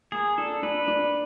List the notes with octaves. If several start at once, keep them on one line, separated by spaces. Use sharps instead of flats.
A#3 G#4
D4 A4
D4 B4
D4